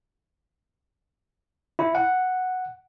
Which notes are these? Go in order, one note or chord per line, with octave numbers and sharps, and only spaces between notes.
E4
F#5